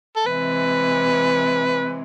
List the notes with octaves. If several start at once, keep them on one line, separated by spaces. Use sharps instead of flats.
A4
C3 E3 G#3 B4